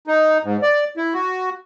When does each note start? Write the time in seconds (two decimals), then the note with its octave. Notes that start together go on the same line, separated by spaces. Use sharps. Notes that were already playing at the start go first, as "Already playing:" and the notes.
0.07 D#4
0.44 G#2
0.62 D5
0.97 E4
1.14 F#4